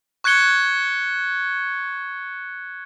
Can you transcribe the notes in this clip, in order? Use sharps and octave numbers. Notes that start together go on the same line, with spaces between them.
C#6 F#6 G#6 C#7 G7